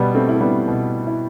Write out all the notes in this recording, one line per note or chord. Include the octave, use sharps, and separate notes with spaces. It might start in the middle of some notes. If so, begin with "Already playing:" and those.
Already playing: B2 G3 B3
A3 C4
E4
A3
G3 B3
B2
E4